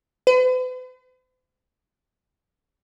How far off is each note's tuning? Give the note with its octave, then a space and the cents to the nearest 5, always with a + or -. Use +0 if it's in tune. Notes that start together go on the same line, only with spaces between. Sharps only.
B4 +45